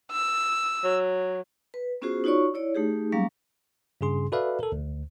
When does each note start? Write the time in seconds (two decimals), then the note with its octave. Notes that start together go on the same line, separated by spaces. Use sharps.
0.11 E6
0.84 F#3
1.74 B4
2.02 B3 C#4 F4 F#4 G#4 C5
2.24 D#4 F4 F#4 C#5 D5 C#6
2.54 E4 C#5 D5
2.75 A3 D#4 G4 G#4
3.12 F#3 G3 A#3 C#4 F5
4.01 G2 C#3 G#4 C6
4.32 F#4 A4 B4 D5 E5 F5
4.60 A4 A#4
4.72 D2